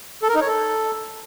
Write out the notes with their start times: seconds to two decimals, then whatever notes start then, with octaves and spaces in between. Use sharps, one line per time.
0.23 A4
0.29 A#4
0.35 D#4
0.41 C#5
0.47 A4